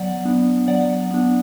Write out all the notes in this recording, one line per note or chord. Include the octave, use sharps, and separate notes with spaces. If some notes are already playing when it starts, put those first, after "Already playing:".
Already playing: F#3 B3 D5 F#5
B3 D4
F#3 D5 F#5
B3 D4